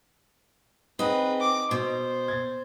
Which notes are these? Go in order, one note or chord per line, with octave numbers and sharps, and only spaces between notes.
C4 D#4 G#4 B4 D#5 F#5
D6
B2 C5
G#6 A6